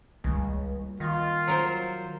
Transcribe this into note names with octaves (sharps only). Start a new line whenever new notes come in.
C#2 G3 A#3
D#3 F4
F#3 A#4 C5